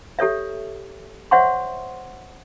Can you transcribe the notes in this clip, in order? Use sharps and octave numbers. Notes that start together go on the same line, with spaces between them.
G4 A4 C#5 E5
C5 C#5 E5 F#5 C6 C#6